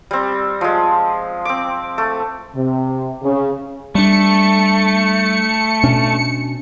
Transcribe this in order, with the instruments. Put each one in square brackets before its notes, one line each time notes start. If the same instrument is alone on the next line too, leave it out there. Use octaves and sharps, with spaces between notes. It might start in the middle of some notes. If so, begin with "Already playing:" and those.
[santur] G3 C4
F3 G#3
C4 D6
A3
[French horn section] C3
C#3
[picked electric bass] G3 D4 [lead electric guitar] A3 [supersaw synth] C#7
[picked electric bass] B2 C#4 D4